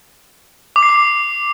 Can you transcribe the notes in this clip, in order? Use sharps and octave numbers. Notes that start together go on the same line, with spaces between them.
D6
C7
D6